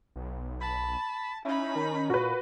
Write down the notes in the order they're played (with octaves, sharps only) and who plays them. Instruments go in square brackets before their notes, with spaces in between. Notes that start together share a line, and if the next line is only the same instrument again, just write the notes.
[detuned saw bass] B1
[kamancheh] A5 [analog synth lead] B5
[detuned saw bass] C#4 [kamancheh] D#4 B5 [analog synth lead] E4
[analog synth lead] D#3
[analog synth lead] A#2 [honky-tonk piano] F#4 B4